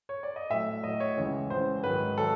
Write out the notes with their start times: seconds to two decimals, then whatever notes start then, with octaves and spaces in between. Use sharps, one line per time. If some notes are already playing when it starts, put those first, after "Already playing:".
0.09 C#5
0.23 D5
0.36 D#5
0.50 A2 F#3 E5
0.84 A2 F#3 D#5
1.00 C#5
1.17 C#2 C#3 E3
1.50 C#2 C#3 E3 C5
1.83 G#2 D#3 F#3 B4
2.17 D#3 F#3 A4